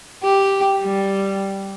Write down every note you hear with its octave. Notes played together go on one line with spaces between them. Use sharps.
G4
G3